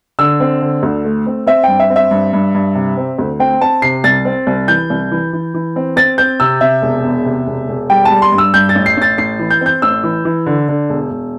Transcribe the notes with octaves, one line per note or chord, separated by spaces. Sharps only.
D3 E6
C4
D3
D2
A3
C4
C4 E5
G2 G5
E5
C4
E5
G2
G2
G2
C3
C4
D2
C4 G5
C4 A5
C3 C7
C2 A6
C4
C2
E3 G6
C2
E3
E3
E3
C4
C4 A6
C4 G6
C3 E6
C3 E5
E1
E2
C3
E1
E1
G3 G5
G3 A5
C6
G2
E6
G2 G6
A6
A1
C7
A1 A6
A1 C7
E3
G6
C4 G6
A1 E6
E3
E3
D3
D3
E1
E1